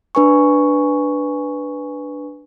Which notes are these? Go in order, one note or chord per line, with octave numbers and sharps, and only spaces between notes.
D4 B4 G#5 C#6